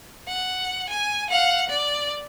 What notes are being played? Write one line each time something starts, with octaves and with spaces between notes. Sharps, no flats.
F#5
G#5
F5 F#5
D5